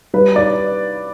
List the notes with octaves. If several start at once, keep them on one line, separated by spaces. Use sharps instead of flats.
G3 B4
D5